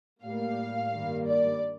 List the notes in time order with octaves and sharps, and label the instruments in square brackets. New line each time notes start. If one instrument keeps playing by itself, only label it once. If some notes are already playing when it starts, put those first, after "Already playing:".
[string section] A2 G3 A#3 F5
G2 D#3 G3 A#3
D5